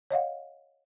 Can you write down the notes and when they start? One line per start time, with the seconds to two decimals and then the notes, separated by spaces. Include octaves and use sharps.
0.11 C#5 D#5 F5 F#5